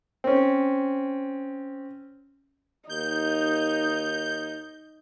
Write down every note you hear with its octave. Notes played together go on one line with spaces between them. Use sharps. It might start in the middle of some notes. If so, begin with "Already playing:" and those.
C4 C#4
D#2 D#4 G6